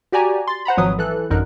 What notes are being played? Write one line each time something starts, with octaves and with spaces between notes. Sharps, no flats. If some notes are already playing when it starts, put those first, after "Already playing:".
F#4 G4 D5 G#5 A#5
C6 A6
C5 F#5 A#5 B5
G#1 F3 F#3 B4 D#6
E3 A4 F#6
A1 F#2 D3 D#4 A#4 F#6